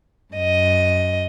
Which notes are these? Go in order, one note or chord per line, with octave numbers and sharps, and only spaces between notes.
F#2 D#5